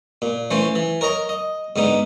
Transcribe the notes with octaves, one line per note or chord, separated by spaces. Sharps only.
A#2
E3 A3 C#4 C5
E3
A#4 C#5 D#5 A#5
D#5
G#2 D3 B3 D#4